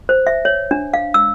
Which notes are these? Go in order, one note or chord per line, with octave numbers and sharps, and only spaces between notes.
C5
E5
C#5
D4
F5
E6